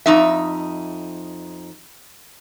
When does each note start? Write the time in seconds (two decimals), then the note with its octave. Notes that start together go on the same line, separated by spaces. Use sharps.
0.06 F2 D#4 E5